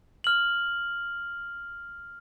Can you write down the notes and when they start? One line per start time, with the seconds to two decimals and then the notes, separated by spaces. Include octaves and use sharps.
0.24 F6 F#7